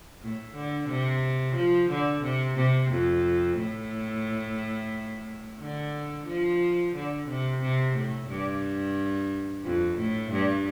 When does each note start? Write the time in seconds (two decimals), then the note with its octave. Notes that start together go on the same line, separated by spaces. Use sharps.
0.21 A2
0.55 D3
0.88 C3
1.55 F3
1.89 D3
2.23 C3
2.57 C3
2.91 F2
3.57 A2
5.60 D3
6.27 F3
6.95 D3
7.29 C3
7.61 C3
7.96 A2
8.29 G2
9.64 F2
9.98 A2
10.32 G2